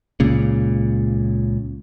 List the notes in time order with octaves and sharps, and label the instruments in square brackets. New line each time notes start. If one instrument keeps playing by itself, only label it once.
[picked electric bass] C#2 A#2 C#3